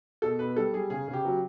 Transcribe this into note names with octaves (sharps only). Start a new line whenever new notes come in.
B2 A4
B2 B4
G3 A4
G3 G#4
C#3 G#4
C#3
G4
F#3